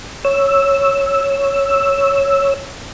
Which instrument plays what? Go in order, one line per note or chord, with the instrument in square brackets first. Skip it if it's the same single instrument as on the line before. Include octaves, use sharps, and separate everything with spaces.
[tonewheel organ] C#5 E6